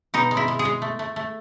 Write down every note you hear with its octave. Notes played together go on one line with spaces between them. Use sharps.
B2 D#4
G#3
E4
G#3
G#4
G#3
A3
A3
A3